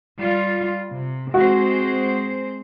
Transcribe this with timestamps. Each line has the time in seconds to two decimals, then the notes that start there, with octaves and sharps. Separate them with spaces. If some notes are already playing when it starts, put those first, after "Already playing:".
0.20 G3 F4
0.95 C3
1.34 G#3 C4 F#4 C5